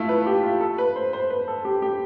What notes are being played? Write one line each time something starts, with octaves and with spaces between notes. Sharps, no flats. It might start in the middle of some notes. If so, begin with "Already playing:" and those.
Already playing: A3 E4 F4
B4
G4
F4
A4
B4
C5
C5
B4
A4
G4
G4